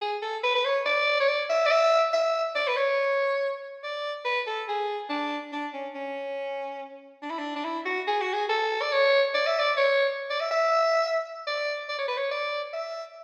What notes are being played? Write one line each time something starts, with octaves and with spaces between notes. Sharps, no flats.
G#4
A4
B4
B4
C#5
D5
C#5
D5
E5
D5
E5
E5
D5
B4
C#5
D5
B4
A4
G#4
D4
D4
C#4
C#4
D4
E4
D4
D4
E4
F#4
G#4
F#4
G#4
A4
D5
C#5
D5
E5
D5
C#5
D5
E5
E5
D5
D5
C#5
B4
C#5
D5
E5